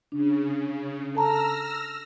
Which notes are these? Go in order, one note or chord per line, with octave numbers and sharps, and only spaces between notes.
C#3 D4
A4 A5 A#5 E6 F6 A#6